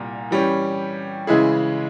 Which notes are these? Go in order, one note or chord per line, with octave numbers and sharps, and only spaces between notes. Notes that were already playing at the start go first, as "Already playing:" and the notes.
Already playing: C2 A#2 G3
E3 G3 C#4 G4
C#3 E3 G#3 E4 G#4